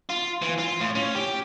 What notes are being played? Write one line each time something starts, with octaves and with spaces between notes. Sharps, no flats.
F4
E3
F4
A2
C#4
G4